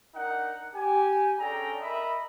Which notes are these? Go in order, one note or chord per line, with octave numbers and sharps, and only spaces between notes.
D4 D#4 A#4 F#5
G4 G#5
C#4 D4 G#4 A4 G5 A#5
A#4 D#5 E5 B5